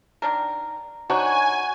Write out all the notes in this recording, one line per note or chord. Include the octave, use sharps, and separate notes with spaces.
D#3 D4 A#4
D4 D#4 F#4 C#5 G#5